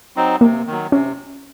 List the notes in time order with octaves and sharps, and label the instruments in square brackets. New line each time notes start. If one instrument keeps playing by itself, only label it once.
[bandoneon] F#3 C4 D#4
[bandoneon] C3 [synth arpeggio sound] A#3
[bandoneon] D#3 F#3
[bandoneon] C3 [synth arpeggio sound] C#4